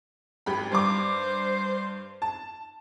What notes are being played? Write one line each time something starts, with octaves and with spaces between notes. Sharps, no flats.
G#1 G4 B5
G2 C5 D6
A5